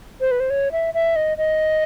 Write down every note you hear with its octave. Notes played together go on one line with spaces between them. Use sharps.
C5
B4
C5
C#5
E5
E5
D#5
D#5